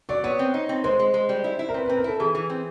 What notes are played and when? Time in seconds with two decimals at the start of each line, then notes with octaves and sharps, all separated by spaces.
0.09 F#3 D5
0.24 B3 C#5
0.39 C4
0.54 D#4
0.69 C4
0.84 G#3 C5
0.99 G#3
1.14 G#3
1.29 G3
1.44 E4
1.59 E4
1.69 A#4
1.74 C4 B4
1.86 C4 B4
1.97 A#4
2.04 E4 A4
2.20 E3 G#4
2.35 E3
2.50 C4